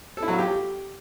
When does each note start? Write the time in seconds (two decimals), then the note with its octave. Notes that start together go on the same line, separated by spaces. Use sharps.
0.17 A4
0.22 E4
0.28 F#3
0.33 F4
0.38 G4